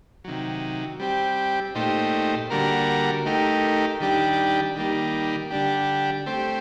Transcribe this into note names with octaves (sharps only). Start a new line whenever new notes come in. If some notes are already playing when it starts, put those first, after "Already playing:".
C3 D#3 F#3
G3 C4 G4
A#2 A3 D#4 G4 C5
D3 G3 A#3 F#4 A#4
A3 D#4 G4 A#4
D#3 G3 D4 G4
D#3 G3 A#3
D3 G3 D4 G4
A3 C4 G4 C5